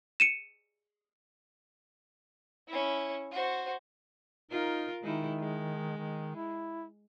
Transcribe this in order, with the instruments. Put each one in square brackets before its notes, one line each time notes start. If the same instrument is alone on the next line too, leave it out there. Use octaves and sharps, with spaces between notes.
[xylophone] C#7 D#7 E7
[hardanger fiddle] C#4 E4
F#4 C5
[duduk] D#4 [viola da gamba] F4 A#4
[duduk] D#3 [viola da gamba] G#3 D#4 E4
[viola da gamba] G#3
[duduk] D#3
E4